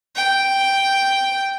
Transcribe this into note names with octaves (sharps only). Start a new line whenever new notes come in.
G5